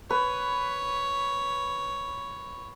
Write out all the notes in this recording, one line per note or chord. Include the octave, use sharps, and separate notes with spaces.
B4 C#5